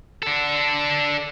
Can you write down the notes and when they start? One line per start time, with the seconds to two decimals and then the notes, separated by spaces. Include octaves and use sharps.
0.23 D4 A4